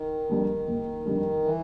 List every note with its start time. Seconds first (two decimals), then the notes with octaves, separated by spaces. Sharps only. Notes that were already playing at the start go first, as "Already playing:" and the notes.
Already playing: D#3
0.29 F2 D3 G3
0.67 F#1
1.06 F2 D3 G3
1.44 E3